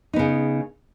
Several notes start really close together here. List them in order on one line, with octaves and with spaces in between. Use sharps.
D#4 B3 C#3